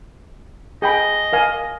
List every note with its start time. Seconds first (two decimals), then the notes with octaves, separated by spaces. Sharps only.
0.82 G#4 D#5 G5 B5
1.33 A#4 F5 G#5